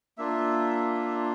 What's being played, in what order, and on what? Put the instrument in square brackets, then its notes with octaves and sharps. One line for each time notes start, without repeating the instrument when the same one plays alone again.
[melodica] A#3 D4 F4 E5